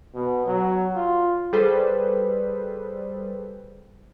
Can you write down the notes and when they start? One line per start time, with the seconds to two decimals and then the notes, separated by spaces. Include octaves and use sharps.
0.14 B2
0.46 F#3
0.95 F4
1.53 G3 G#4 A4 B4 C5